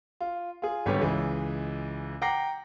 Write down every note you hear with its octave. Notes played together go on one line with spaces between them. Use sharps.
F4
F4 G#4
G#1 D3 G3 B3 G4 C#5
C#2 E3 G#3
F#5 G5 A#5 D6 A#6 C7